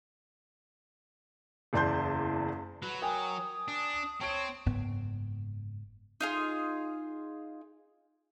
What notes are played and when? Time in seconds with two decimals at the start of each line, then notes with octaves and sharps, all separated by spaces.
1.73 F#1 E2 D5 A5 C6 G6
2.82 F#3 B4
3.02 A#4 G5 G#5 D#6
3.68 D4
4.21 C4 C#5 A5 D7
4.66 F#1 G#2 B3
6.21 D#4 F4 G#4